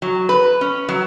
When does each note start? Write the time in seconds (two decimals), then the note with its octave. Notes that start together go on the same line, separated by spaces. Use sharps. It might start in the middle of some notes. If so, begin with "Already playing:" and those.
0.02 F#3
0.29 B4
0.61 C#4
0.89 F#3